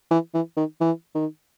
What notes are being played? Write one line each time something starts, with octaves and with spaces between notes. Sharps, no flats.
E3
E3
D#3
E3
D#3